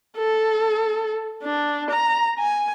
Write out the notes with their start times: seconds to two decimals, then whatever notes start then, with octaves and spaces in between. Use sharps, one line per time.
0.17 A4
1.44 D4
1.91 A#5
2.39 G#5